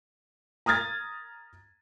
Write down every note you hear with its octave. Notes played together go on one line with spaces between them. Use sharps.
A#5 D#6 F6 G#6 A6